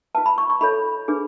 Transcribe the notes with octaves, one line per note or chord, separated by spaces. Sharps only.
F4 B4 A5
B5
C#6
C#6
F4 A4 C#5 B5
D4 G#4 B4